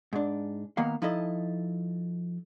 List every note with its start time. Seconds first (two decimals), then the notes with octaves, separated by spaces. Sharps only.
0.13 G#2 D4
0.77 D#3 A#3 B3 F5
1.02 F3 D#4 E4 A4 D#5